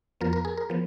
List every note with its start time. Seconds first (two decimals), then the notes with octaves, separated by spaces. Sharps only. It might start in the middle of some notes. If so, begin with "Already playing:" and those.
0.21 F2 F3 B3 A#4
0.33 A#4
0.45 G#4
0.57 A#4
0.70 F3 B3